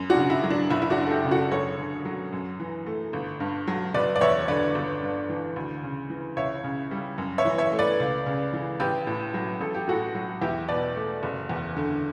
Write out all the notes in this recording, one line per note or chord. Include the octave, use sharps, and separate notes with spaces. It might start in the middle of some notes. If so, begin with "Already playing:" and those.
Already playing: F#2
D4 F#4
C#3
E4
F#3
D4
F#1 E4
E4
D4 F#4
F#2
A4
E4 G4
C#3
F#4 A4
F#2 A4 C#5
D3
F#3
F#2
E3
A3
G1
G2
F#3
F#1 B4 D5
D5
E2 C#5 E5
D3 B4 D5
G1
G2
E3
D2
C#3
E3
C#2 C#5 E5
C#3
G3
F#2
C#5 E5
E3
C#5 E5
A3
B4 D5
C#2
C#3
E3
A1 G4 B4
A2
F#3
A1 A4
G4
A2 F#4 A4
F#3
E2 E4 G4
B2 B4 D5
A3
F#1
E2
D3